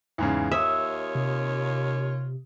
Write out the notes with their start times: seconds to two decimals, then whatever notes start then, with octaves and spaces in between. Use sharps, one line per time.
0.18 E2 G#2 C#3
0.52 D#2 F4 C#5 E5 D#6
1.15 C3